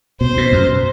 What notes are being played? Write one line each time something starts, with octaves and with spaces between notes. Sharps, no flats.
B2 C5
B2
F#2